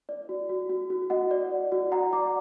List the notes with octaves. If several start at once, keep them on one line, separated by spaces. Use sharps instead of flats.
D5
F#4
F#4
F#4
F#4
F#4 D#5 F#5
D5
D5
F#4
D5 F#5 A#5
D5 A#5 D6